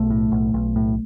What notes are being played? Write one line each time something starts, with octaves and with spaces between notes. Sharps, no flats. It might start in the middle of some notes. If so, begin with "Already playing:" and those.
Already playing: B1 A3
A2
B1
B1
A2